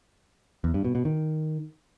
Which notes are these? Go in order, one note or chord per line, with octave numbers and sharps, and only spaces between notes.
E2
G2
B2
B2
D#3